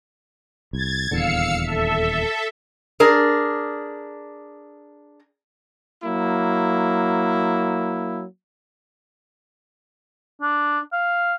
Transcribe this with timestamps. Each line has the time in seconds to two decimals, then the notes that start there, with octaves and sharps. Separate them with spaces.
0.73 C2 G#6 A6
1.11 D#1 E2 D3 F5 E6 C#7
1.63 A4 E5
3.00 D4 G#4 A#4
6.04 F#3 A#3 E4
10.42 D4
10.92 F5